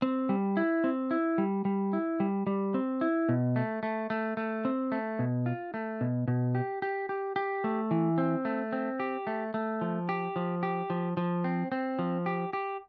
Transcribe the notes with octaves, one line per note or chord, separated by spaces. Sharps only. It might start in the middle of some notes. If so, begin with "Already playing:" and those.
C4
G3
E4
C4
E4
G3
G3
E4
G3
G3
C4
E4
B2
A3
A3
A3
A3
C4
A3
B2
F4
A3
B2
B2
G4
G4
G4
G4
A3
E3
C4
A3
C4
G4
A3
A3
F3
G4
F3
G4
F3
F3
C4
C4
F3
G4
G4